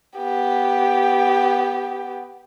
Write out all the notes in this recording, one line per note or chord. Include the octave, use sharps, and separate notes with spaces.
B3 G4